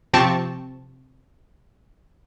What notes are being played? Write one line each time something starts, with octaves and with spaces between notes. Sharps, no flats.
C3 F3 C4 G4 A5 C#6